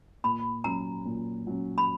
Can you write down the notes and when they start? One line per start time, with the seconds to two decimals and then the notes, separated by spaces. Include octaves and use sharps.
0.24 A#2 B5
0.64 F#3 C#4 A#5
1.06 A#2
1.47 F#3 C#4
1.78 B5